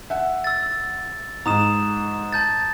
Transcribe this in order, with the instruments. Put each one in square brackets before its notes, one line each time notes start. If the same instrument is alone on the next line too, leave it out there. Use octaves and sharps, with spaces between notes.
[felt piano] E5 F#5
[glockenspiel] E6 A6
[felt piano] G#2 [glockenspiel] A#5 D#6 E7
[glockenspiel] A5 G6 A6